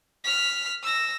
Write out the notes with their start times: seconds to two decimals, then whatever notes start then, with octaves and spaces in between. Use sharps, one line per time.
0.24 F6 B6
0.83 E6 A#6